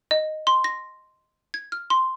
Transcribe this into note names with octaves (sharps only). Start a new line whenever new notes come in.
D#5
C6
A#6
G#6
F6
C6